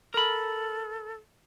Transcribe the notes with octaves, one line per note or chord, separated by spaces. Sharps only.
A4 A#4 B5